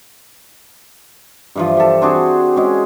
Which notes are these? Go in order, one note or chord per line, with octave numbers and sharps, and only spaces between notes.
G2 E3 F3
G4 A4
C4 D4 F#4 G#4
G#3 C#4